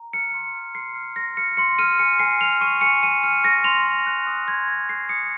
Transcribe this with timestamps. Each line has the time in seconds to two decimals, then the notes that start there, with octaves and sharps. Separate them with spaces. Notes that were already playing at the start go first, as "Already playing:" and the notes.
Already playing: A#5
0.13 F6 C#7
0.34 C6
0.55 F6
0.75 C6 C7
0.95 F6
1.16 C6 A#6
1.37 F6 C#7
1.57 C6 C#7
1.79 F6 D#7
1.99 G#5 C#7
2.19 G#5 C7
2.41 F6 F7
2.61 C#6 D#7
2.81 G#5 C#7
3.03 G#5 D#7
3.23 F6 C#7
3.43 C#6 A#6
3.64 C6 F7
3.85 C6
4.07 F#6
4.27 D#6
4.47 C6 G#6
4.68 C6 A#6
4.89 F#6 C7
5.09 D#6 C#7